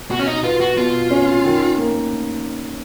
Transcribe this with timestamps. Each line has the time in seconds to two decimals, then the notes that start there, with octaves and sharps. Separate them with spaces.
0.10 B2 F#4
0.19 C#4
0.27 D#4
0.44 B3 F4
0.60 F#4
0.77 B2 F4
1.11 C#4
1.44 D#3
1.77 A#3